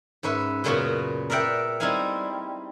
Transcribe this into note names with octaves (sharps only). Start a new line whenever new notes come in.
G#2 C#4 B4 E5
F#2 A#2 C#3 B3 C#4 F#4
A#4 D5 E5 F#5 G5
G3 C4 D#4 E4 F5 G#5